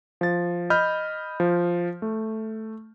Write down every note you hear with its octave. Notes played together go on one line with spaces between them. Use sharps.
F3 A6
D#5 B5 F6 G6
F3
A3